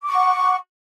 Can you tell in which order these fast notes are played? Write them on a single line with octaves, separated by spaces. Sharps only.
D6 C#6 F#5